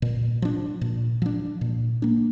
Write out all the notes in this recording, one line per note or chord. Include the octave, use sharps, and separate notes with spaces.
A#2
F3 D4
A#2
F3 D4
A#2
A#3 D4